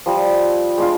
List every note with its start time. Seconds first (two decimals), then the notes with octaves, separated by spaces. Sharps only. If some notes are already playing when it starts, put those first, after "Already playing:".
0.06 F3 G3
0.78 G#3 D4 F4